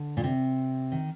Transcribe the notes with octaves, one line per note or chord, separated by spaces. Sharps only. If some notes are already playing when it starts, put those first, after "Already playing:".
Already playing: D3
A#2
C3
D#3